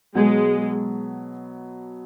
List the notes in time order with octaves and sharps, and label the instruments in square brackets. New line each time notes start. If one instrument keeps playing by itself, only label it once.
[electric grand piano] B2 F#3 B3 [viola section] G#3